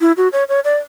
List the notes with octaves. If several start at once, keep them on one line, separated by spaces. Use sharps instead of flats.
E4
F#4
C#5
C#5
D5